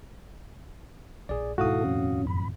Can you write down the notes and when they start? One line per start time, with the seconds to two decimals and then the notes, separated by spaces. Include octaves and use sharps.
1.29 A#1 G#4 D5
1.58 D#2 G#2 B2 E4 F#4 A4 F5 D#6
1.84 F2 A2 C#4
2.27 F#2 B5